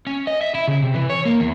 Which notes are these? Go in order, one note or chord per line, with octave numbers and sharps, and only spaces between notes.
C#4
D#5
E5
E4
C#3
C3
E3
C#5
A#3
E2